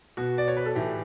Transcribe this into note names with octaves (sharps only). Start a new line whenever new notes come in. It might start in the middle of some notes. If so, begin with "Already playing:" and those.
B2 F#4
D5
C#5
B4
A4
A2 E3 G4